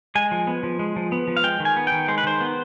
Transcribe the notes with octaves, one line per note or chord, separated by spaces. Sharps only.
G#3 G#5
F3
B3
F3
G#3
F3
B3
F3
F5
G#3 G5
D#3
G#5
B3
D#3 G5
G#3 C5
B4
D#3 C5
B3